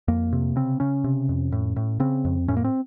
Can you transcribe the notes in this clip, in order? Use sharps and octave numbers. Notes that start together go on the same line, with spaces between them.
F2 A#3
C3
C#3 C4
C#3 C#4
C3
F2
A2
A2
C#3 C4
F2
A2 C#4
A#3
C4